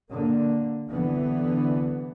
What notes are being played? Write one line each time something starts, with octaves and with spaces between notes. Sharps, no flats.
D3 A#3
C2 D3 E3 B3